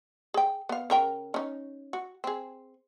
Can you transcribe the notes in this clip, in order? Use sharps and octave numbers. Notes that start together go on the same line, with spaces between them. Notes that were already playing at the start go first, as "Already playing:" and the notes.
G#4 G5
B3 F5
C#3 A#4 G5
C#4 D#4
F#4
C4 G#4